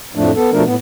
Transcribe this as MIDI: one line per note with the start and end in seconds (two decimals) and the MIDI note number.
0.16 0.31 41
0.16 0.31 45
0.16 0.31 53
0.16 0.31 57
0.16 0.31 62
0.36 0.50 59
0.36 0.50 69
0.52 0.63 47
0.52 0.63 53
0.52 0.63 57
0.52 0.63 62
0.52 0.63 70
0.66 0.75 45
0.66 0.75 59